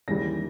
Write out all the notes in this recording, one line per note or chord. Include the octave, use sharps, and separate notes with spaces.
D#2 C#3 E3 G3 A#6